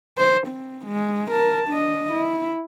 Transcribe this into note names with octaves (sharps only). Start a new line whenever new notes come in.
C5
C4
G#3
A#4 A5
D4 D#5
E4